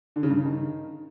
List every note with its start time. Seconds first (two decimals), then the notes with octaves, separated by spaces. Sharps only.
0.16 D3
0.23 C#3
0.30 G2
0.37 C#3
0.44 D#3